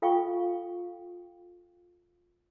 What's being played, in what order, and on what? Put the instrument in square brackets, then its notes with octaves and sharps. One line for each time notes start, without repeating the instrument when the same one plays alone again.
[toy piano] F4 A4 F5 G5 G#5 C#6